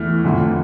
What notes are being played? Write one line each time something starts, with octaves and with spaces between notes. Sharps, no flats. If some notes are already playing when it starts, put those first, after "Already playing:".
Already playing: E2 E3 A3 E4 F6
F2 D3 A3